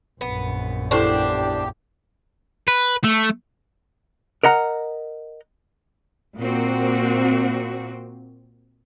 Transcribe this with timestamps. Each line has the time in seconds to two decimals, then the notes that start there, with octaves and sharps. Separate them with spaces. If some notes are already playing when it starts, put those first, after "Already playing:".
0.21 A#1 F#2 B3
0.91 E2 D4 E4 G4 A4 C5 C#6
2.68 B4
3.04 A3
4.43 A#4 D#5 F#5 A#5
6.38 A#2 A#3 C4 F#4